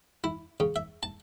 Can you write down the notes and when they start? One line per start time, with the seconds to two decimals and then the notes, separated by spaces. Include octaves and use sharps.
0.24 E4
0.60 C#3
0.76 E5
1.03 A5